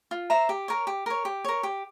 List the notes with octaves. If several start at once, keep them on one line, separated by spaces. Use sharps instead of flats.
F4
C5 E5 A#5
G4
A#4 C#5
G4
A#4 C#5
G4
A#4 C#5
G4